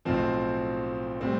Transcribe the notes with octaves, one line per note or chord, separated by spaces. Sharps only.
B1 A2 F3 C4
A2 G3 C4